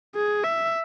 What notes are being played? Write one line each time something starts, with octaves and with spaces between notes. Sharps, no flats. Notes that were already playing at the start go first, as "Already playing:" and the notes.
G#4
E5